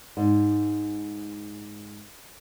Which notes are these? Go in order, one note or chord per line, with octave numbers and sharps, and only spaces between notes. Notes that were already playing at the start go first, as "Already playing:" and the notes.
G#2